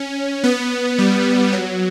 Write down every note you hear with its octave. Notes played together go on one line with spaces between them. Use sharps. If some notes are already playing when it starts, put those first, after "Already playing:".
Already playing: C#4
B3
G3
F#3